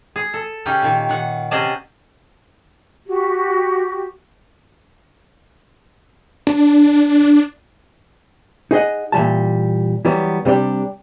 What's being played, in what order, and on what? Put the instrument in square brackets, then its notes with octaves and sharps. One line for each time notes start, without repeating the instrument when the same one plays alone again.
[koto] G#4
A4
C#3 C#4 D#4 G4 G5
A#2 D#3
D#3 F#5
C3 C#4 G#4 D5 D#5 A5
[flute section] F#4 G4
[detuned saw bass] D4
[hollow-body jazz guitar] D#4 G#4 D#5 F#5
A#2 E3 G3 A5
E3 F#3 G3 B3
C3 G3 D4 G4